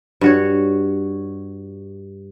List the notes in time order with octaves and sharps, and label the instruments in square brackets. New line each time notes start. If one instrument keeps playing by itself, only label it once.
[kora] G2 F#4 C#5